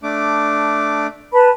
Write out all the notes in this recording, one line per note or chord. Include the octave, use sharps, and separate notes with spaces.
A3 D4 D6
B4 A5 B5